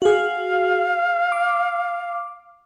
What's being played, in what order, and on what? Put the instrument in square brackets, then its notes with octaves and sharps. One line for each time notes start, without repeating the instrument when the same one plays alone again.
[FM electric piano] F#4 G#4 [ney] F5
[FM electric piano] D6